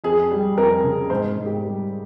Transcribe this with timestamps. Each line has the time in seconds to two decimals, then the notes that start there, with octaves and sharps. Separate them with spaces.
0.04 F2 G#4
0.31 G3
0.58 F2 A#4
0.84 C#3
1.10 G#2 C5
1.37 G#2
1.46 G4
1.64 G3